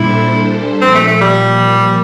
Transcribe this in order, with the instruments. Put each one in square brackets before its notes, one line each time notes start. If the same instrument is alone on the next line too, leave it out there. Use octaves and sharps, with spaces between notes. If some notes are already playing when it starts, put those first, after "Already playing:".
Already playing: [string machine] A#2 G3 D4 A4 C5 [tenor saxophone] E4
[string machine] A#2 F3 A#3 [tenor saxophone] C4
[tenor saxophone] A3
A3
G3